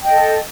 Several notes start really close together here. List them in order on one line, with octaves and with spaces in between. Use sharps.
G5 D#5 A4